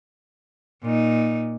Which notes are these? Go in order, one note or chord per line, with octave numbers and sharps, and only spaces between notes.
A#2 D#4